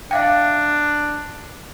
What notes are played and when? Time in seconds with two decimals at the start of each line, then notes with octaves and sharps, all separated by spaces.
0.11 D4 E5 F5 G5